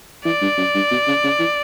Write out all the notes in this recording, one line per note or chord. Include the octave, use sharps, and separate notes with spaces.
E3 D5
G2
F#2
G2
B2
C#3
C#3
E3